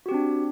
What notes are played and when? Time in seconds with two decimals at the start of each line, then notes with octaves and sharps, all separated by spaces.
0.06 F#4
0.09 G4
0.11 C4
0.14 D4